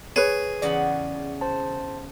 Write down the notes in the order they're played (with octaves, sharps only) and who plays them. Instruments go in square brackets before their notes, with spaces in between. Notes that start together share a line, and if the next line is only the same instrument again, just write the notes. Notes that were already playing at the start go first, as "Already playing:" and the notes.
[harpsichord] G#4 [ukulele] B4 C#5
[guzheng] E2 C#3 F#5 [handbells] D5
[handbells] C5 A5